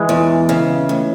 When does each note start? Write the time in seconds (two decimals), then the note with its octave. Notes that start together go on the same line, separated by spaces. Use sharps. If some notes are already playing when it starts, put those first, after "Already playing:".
Already playing: E3 G#3
0.09 E2
0.49 C#3
0.89 A2